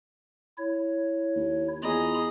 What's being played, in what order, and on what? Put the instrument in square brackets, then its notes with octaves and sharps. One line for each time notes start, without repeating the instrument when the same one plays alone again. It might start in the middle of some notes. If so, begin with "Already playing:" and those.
[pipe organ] E4 C#5
[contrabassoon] D#2
[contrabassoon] E2 [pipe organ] F4 A#5 B5 [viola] G#4 D#5